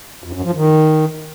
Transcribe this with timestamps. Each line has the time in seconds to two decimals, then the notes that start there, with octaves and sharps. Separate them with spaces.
0.24 F2
0.34 F#2
0.44 F3
0.55 D#3